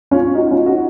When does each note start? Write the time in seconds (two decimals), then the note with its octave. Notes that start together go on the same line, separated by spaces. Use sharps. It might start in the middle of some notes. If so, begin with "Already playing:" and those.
0.11 C#4 F4
0.35 D#4 F#4
0.51 C#4 F4
0.66 D#4 F#4